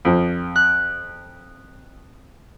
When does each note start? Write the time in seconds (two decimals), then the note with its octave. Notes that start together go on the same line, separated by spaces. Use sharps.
0.05 F2 F3
0.56 F#6